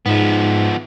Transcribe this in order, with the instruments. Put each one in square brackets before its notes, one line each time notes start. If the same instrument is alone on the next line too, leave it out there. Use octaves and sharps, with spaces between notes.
[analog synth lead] G#2 [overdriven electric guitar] F3 B3